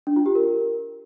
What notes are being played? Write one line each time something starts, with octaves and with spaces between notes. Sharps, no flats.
D4
F4
G4
A#4